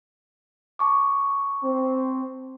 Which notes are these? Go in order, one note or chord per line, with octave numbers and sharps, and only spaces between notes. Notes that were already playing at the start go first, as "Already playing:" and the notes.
A5 C#6 D6
C4